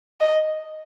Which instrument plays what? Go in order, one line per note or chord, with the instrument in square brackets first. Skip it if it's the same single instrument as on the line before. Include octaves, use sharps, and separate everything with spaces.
[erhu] D#5